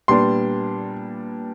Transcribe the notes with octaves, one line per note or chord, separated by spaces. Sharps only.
A#2 G3 B3 D4 C6